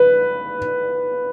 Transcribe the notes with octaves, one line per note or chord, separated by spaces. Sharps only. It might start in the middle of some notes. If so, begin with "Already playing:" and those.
Already playing: B4